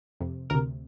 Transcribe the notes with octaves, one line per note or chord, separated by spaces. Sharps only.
F2 C3
D2 C3 A#4